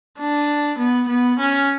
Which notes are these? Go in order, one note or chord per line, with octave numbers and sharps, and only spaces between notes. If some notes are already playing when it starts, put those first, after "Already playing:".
D4
B3
B3
C#4